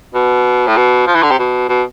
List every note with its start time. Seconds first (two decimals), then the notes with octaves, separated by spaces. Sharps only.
0.14 B2
0.67 A2
0.77 B2
1.07 F3
1.15 E3
1.23 D3
1.31 C3
1.39 B2
1.69 B2